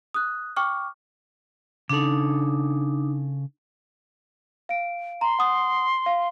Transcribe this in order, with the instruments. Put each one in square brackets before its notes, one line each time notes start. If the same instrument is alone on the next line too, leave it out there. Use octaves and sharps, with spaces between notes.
[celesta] D#6 F#6
G5 C#6 D6 F6
[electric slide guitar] C#3 A4 [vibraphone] D4 D#4
[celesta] F5 D7
[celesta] A#5 [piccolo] C6
[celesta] F#5 D#6
F5